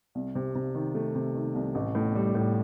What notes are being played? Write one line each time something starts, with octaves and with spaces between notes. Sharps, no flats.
C2
C3
C3
D#3
A3
C3
D#3
C2
A1
A2
G3
A2